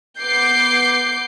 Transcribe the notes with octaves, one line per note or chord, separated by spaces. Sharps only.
B3 D6 G6 C7